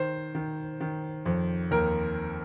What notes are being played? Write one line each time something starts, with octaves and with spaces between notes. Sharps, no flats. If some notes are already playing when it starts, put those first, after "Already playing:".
Already playing: D#3 C5
D#3
D#3
F2
D#2 A#4